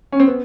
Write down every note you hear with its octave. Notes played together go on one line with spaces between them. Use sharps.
C#4
C4
B3